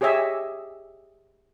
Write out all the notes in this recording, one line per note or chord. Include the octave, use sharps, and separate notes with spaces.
G4 G#4 C#5 D#5 E5 G#5